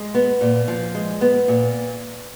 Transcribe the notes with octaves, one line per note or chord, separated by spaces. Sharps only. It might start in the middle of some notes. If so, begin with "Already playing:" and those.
Already playing: G#3
B3
A#2
F3
G#3
B3
A#2